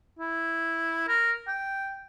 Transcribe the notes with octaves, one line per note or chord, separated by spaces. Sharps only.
E4
A#4
G5